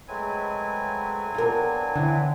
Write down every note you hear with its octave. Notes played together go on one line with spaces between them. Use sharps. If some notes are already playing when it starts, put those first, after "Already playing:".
F#3 G#3 A3 C4 B4 G#5
B3 D4 F4 A#4
D3 E3